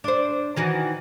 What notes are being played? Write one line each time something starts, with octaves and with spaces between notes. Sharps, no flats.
D4 C5
D#3 E3 F#4